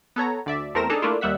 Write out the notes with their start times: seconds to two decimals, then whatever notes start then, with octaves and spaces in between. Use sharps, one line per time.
0.16 B3 A4 C#5 A#5
0.46 D2 D5 E5
0.74 E2 A3 C4 A#4 A#6 E7
0.89 D4 D#4 G#4 A4 A5 A#5
1.02 A3 A#3 D4 E4 F4
1.21 D#2 G3 E5 F#5 B6